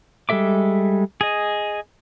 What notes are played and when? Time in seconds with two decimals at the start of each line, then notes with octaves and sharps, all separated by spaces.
0.29 G3 G#3 A4 E5 D6
1.21 G#4 D#5